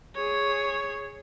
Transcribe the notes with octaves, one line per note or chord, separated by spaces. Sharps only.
G#4 C#5